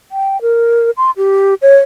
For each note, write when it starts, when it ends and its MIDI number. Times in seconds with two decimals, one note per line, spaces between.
0.12 0.40 79
0.42 0.91 70
0.97 1.11 84
1.17 1.54 67
1.62 1.77 73